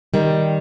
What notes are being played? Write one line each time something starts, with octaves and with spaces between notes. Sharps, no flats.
D#3 G3